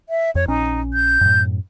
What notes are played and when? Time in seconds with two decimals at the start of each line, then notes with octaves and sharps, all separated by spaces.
0.09 E5
0.35 F2 C#5
0.48 A#1 C#4 D#4
0.93 G6
1.21 F#2 A2